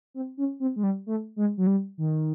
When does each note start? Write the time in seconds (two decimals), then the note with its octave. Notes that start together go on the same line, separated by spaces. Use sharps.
0.14 C4
0.37 C#4
0.60 C4
0.76 G#3
0.83 G3
1.06 A3
1.36 G#3
1.57 F#3
1.67 G3
1.98 D#3